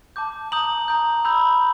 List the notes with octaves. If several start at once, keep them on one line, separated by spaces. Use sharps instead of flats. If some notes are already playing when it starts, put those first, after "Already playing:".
A5 D6 G6
A#5 D#6 G6 F#7
A#5 D#6 G6
B5 E6 G6